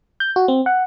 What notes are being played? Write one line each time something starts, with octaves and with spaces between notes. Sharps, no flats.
G6
F#4
C4
F#5